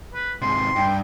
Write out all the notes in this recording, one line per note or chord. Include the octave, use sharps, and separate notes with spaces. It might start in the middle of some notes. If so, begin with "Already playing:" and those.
B4
G#2 C3 C6
G2 G5